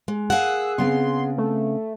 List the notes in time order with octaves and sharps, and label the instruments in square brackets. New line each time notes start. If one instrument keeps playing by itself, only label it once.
[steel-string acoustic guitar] G#3
[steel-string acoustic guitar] G#4 F#5 [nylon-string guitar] A#4 F5 [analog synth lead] E6
[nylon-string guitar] C#3 B3 C4 [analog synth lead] C6
[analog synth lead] A3